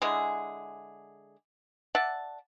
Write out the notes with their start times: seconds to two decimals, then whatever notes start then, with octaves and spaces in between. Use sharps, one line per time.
0.02 D3 G#3 E4 G#4
1.95 D5 E5 F#5 A5